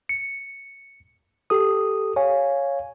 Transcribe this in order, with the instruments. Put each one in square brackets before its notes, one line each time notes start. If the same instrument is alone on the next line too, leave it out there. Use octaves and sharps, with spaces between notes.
[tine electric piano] C#7
G4 A4 D#6
C#5 F5 G#5